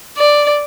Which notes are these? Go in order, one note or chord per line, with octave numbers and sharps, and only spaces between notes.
D5